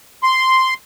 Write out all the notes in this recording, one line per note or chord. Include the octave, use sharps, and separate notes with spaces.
C6